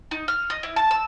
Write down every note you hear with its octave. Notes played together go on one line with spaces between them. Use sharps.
D#4
F6
D#5
E4
A5
E6